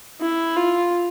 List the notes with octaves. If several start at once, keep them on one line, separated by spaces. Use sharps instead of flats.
E4
F4